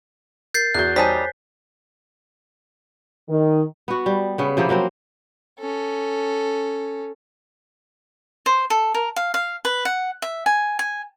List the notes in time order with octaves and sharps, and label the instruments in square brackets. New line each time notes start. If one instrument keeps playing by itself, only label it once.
[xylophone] A#4 [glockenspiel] G6 A6 C7
[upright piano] E2 F#4 G6 [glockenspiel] F#6
[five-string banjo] G3 D#4 A5 [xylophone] C5 C#5 G#5 [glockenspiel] B6
[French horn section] D#3
[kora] B3 F#4
G3
C#3 B3
C3 F3 A#3 B3
F3 F#3 A#3 C4
[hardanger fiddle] C#4 A4
[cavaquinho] C5
A4
A#4
F5
F5
B4
F#5
E5
G#5
G#5